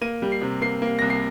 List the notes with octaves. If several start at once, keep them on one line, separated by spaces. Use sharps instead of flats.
A#3 D#7
G3
C7
C3
A#3 C7
A#3
C2 A#6
C7